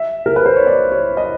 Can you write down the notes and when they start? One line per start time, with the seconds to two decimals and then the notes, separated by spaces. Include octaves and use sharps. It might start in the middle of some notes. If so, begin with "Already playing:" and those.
Already playing: E5
0.26 A#4
0.36 B4
0.46 C5
0.56 C#5
0.67 D5
0.92 C#5
1.17 D#5